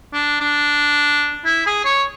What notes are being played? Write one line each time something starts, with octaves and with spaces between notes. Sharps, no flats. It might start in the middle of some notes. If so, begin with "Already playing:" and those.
D4
D4
E4
G#4
C#5